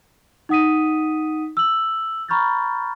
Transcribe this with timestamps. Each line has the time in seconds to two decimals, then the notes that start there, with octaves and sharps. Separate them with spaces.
0.49 D#4 F#5 D#6 B6 D#7
1.57 E6 F#7
2.29 A#5 B5 C#6 F6 G6 A6